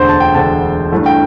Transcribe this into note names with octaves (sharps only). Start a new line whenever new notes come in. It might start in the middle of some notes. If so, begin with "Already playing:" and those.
Already playing: E1 D2 D3 C5
A5
G5
E1 D2 D3 A5
G1 G2 E3 A3
G5